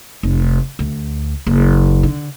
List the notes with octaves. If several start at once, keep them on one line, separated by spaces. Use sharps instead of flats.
F1
D2
F#1
D3